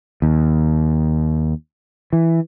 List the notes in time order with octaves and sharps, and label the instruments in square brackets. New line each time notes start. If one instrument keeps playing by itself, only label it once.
[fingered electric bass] D#2
E3